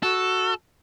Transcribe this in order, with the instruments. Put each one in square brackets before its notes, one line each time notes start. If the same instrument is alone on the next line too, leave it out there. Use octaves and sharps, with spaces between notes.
[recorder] F#4 [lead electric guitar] A4